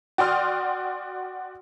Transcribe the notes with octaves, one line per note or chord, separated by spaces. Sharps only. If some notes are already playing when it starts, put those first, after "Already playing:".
F#4 D5 G5 C6 D#6 F6